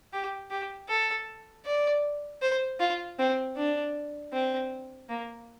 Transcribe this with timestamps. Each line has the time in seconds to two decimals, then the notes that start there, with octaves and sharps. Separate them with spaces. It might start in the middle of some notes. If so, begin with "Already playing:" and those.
0.13 G4
0.51 G4
0.89 A4
1.65 D5
2.42 C5
2.80 F4
3.19 C4
3.57 D4
4.33 C4
5.09 A#3